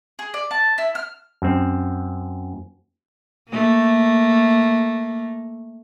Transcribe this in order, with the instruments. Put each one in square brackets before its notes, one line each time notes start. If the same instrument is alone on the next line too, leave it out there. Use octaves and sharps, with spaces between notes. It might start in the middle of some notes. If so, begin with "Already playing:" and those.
[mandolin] G#4
D5
A5
E4
F6
[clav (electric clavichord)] F#2 C4
[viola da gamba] A3 A#3